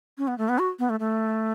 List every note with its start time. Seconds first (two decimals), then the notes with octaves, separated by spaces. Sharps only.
0.18 C#4
0.28 B3
0.38 A3
0.49 B3
0.59 F#4
0.79 B3
0.90 A3
1.00 A3